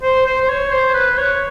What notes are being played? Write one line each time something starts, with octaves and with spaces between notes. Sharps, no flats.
C5
C5
C5
C#5
C5
B4
C#5